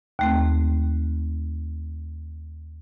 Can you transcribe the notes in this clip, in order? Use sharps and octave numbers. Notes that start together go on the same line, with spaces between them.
D#2 A3 C4